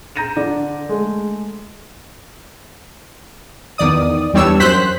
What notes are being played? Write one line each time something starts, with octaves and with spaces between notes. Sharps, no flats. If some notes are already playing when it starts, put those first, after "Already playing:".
A#5 G6 A#6 D#7 E7
D3 D5
G#3 A3
E2 D#3 D5 D#6
E2 G3 D4 C#5 E6
F#2 C5 F#6 B6